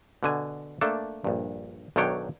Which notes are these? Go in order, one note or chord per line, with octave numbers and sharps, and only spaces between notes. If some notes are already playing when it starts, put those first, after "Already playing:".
B2 D3 G#5
A3 A#3 D4 A4
A#1 G2
B1 D#3 F#3 D4 C#5 G5